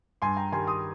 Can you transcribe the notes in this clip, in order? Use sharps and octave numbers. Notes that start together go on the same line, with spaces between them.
G2 G#5 C6
G5 A#5
D#3 G3 G#5 C6
C6 D#6